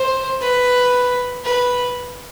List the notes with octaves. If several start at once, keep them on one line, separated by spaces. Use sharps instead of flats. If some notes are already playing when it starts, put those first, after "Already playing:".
Already playing: C5
B4
B4